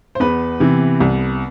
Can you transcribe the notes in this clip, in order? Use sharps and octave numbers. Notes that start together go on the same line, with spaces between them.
C5
E2 B3 B4
C3 E3
C2